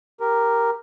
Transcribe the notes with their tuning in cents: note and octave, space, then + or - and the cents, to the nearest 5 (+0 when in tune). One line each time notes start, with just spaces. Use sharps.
G4 +0 A#4 +0